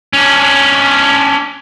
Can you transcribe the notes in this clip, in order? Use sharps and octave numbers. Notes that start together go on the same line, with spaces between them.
C#4 D4